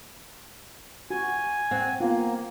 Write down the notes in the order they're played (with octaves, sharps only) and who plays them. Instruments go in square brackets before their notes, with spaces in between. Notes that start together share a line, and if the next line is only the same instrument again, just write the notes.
[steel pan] F#4 [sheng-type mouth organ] G#5
[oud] C4 [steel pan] F#5
[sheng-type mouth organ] A#3 [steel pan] B3 F4